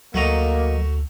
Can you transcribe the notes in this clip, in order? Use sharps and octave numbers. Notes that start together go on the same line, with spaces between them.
D2 F#3 A3 A#3 F#4 D#5 A#5